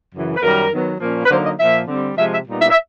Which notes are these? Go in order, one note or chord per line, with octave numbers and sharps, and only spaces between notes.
F#2 C#3 E3
B4
F#2 D#3 G3 A#4
D#3 F#3 B3
A#2 F3 A#3 C#4
B4
D3 F#3 A#3 D#4 C5
D#5
A#2 F3 A#3 E5
D3 G3 C4
C3 F3 G#3 E5
E5
A#2 G3 B3 D#4
E5
E5